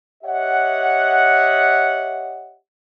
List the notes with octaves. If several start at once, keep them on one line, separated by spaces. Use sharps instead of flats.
G4 C#5 D#5 E5 F#5